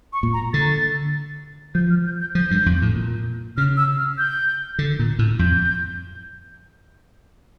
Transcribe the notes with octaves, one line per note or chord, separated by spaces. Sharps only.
C#6
A#2
A#5
D3 A6
F3 G6
F6
G6
G6
F3 G6
G2
F2
A2
A#2
C#3 F6
E6
F6
G6
D3
A#2
A2
F2 G6